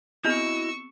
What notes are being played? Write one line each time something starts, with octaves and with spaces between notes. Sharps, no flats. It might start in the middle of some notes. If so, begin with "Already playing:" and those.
B3 C4 E4 F#4 G#4 D#5 C#6 E6